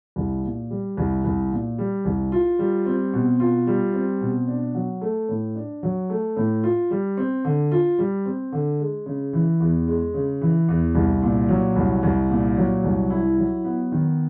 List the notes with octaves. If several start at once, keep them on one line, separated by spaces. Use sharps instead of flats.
C2
A#2
G3
C2
C2
A#2
G3
C2
F4
G3
C4
B2
F4
G3
C4
B2
D4
F#3
A3
A2
D4
F#3
A3
A2
F4
G3
C4
D3
F4
G3
C4
D3
G#3
C#3
E3
E2
G#3
C#3
E3
E2
C2
A#2
F#3
C2
C2
A#2
F#3
C2
E4
F#3
B3
D#3